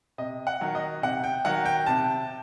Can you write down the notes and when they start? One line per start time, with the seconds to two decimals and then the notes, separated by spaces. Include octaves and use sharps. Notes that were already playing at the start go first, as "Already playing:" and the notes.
0.18 C3 D#5
0.47 F#5
0.61 D#3 F#3
0.75 D#5
1.02 C3 F#5
1.24 G5
1.45 D#3 F#3 F#5
1.66 G5
1.86 C3 A5